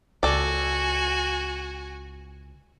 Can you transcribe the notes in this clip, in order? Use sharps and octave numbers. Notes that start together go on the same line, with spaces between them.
C#2 F#4 A4 D5 G#5